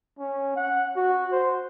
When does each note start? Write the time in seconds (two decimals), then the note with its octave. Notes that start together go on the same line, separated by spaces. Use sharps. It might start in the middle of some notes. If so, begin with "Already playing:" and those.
0.19 C#4
0.56 F#5
0.96 F#4
1.32 C5